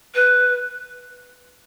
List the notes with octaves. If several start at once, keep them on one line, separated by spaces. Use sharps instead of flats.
B4